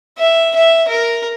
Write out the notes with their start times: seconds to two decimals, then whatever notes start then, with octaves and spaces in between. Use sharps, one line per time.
0.18 E5
0.56 E5
0.89 A#4